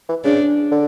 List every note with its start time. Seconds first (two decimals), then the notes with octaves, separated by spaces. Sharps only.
0.09 E3
0.25 C#3 D4
0.72 D3